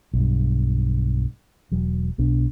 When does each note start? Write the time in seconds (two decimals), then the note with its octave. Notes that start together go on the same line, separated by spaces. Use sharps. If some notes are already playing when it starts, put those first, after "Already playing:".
0.14 B1 G2
1.72 E1 F#3
2.18 B1 B2 D4